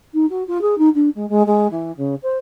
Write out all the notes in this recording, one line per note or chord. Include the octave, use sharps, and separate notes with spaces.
D#4
F#4
F4
G#4
D#4
D4
G#3
G#3
G#3
E3
C#3
C5